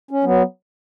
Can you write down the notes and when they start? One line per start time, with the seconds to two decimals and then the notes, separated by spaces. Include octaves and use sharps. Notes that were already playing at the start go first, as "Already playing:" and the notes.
0.11 C#4
0.24 F#3 B3